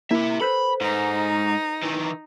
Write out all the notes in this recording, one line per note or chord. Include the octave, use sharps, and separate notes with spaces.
A#3 E4 G4 E5
A4 B4 C5 B5
G#2 D#4
D#3 E3